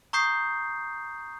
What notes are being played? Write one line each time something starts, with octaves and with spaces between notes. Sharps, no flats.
A#5 C#6 D#6 G6 C7